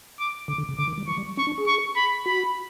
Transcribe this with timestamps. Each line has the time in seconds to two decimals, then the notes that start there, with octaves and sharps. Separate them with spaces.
0.19 D6
0.48 D3 D6
0.58 D3
0.69 C#3
0.78 D3 D6
0.88 D#3
0.98 G3
1.08 E3 C#6
1.18 G3
1.37 C#4 C#6
1.47 D4
1.58 G#4
1.67 C#6
1.96 B5
2.26 F#4 B5